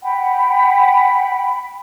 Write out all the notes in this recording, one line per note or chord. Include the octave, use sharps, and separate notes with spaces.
F#5 G5 B5